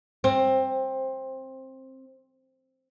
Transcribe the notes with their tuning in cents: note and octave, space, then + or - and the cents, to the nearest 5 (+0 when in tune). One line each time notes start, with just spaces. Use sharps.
C4 +15